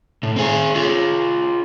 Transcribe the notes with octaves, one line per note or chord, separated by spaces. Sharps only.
A2
C4 G#4
F4 G#4